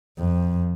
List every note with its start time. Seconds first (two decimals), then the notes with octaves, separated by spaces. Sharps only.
0.18 F2